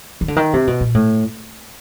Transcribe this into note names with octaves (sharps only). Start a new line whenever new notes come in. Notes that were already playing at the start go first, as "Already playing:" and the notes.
D#3
D3
D#3
C3
B2
A#2
A2